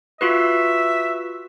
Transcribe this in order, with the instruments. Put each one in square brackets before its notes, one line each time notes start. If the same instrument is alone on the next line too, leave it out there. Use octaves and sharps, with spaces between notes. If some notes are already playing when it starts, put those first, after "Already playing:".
[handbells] F4 F#4 B4 [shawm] E5